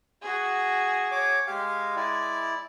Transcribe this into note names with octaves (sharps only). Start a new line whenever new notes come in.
F#4 G#4
C#5 D6
G#3 G4 F5
E4 D5